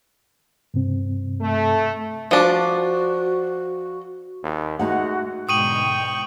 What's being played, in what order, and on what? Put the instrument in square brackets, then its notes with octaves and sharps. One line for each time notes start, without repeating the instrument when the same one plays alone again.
[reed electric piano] G2 C3 C4
[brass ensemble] A3
[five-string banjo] F3 D4 [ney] F#4
[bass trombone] D#2
[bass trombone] G#3 [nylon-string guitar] A3 D#4 F#5 [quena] F#4
[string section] G#2 B2 D3 [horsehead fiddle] G5 [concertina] C#6 [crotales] D#6 D#7 F#7